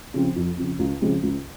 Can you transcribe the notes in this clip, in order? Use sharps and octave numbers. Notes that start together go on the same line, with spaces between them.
C#3 F3 C4
F2
C#3 F3 C4
C#2
C#3 F3 G#3 C4
C#2